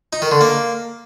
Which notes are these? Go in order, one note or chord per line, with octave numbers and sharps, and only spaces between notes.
D#4
D#3
D3
A#3